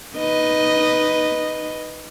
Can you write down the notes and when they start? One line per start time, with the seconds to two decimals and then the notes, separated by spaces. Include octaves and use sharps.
0.17 D#4 B4 D#5